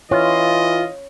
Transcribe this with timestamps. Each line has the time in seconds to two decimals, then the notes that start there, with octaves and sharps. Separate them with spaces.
0.11 E3 F4 C#5 D#5